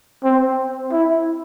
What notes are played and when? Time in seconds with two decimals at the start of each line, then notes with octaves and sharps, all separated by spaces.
0.24 C4
0.92 E4